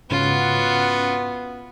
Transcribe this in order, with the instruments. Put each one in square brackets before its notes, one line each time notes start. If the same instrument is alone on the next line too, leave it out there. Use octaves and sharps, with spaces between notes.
[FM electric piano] G#2 C#3 C#4 [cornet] B3 [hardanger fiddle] F4 F#4